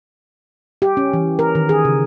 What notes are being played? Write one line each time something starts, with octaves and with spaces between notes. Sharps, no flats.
G4
C#4
E3
A#4
D#3
G#4
C#3